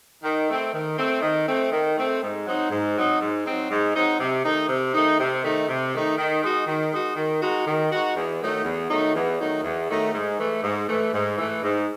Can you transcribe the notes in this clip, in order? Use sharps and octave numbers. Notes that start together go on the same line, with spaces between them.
D#3
A3 C4
D#3
A3 C4
D#3
A3 C4
D#3
A3 C4
G#2
F#3 C4 D#4
G#2
F#3 C4 D#4
G#2
F#3 C4 D#4
G#2
F#3 C4 D#4
C3
D#3 A3 D#4
C3
D#3 A3 D#4
C3
D#3 A3 D#4
C3
D#3 A3 D#4
D#3
G#3 D#4 F#4
D#3
G#3 D#4 F#4
D#3
G#3 D#4 F#4
D#3
G#3 D#4 F#4
E2
D#3 F#3 A3 D#4
E2
D#3 F#3 A3 D#4
E2
D#3 F#3 A3 D#4
E2
D#3 F#3 A3 D#4
G#2
E3 A3
G#2
E3 A3
G#2
E3 A3
G#2